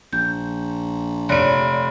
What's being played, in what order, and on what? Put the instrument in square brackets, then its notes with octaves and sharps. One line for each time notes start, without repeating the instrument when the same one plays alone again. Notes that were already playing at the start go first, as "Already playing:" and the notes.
[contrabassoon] A#1 [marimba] G6
[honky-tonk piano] F1 D7 [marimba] C#5 D5